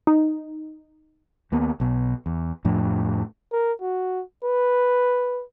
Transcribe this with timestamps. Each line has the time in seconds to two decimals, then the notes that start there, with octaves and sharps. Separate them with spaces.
0.07 D#4
1.52 D#2 A#3 B3
1.80 B1 B2
2.26 E2
2.65 F2 A2 F3 D4
3.52 A#4
3.81 F#4
4.44 B4